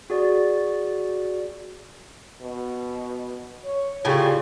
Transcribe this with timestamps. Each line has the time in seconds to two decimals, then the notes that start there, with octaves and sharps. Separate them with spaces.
0.10 F#4 G#4 D5
2.41 B2
3.65 C#5
4.05 A2 C#3 G3 F4